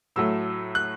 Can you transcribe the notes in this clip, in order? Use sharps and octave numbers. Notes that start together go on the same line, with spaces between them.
A2 F#3 A3 E6
F#6